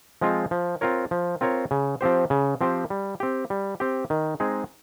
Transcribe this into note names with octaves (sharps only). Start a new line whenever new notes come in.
F3 G#3 C4 F4
F3
C4 F4 A#4 C#5
F3
C4 F4 A#4 C#5
C#3
F3 C4 G4 C5
C#3
F3 C4 G4 C5
G3
C4 G4
G3
C4 G4
D#3
G#3 C4 D#4 G#4